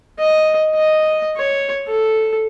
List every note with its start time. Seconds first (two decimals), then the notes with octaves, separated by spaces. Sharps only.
0.19 D#5
0.75 D#5
1.37 C#5
1.88 A4